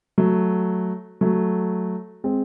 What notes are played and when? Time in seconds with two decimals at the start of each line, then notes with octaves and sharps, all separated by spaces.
0.18 F#3 A3
1.21 F#3 A3
2.24 G#3 C4